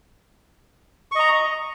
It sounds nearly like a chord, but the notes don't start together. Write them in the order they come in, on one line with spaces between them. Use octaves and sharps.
C#6 D#5 A#5